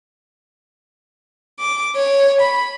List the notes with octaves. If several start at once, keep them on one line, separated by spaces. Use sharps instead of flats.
D6
C#5
B5